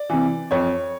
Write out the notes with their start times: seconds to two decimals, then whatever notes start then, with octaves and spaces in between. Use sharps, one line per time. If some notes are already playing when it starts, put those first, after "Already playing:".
Already playing: D5
0.10 C3 E3
0.51 F2 C#5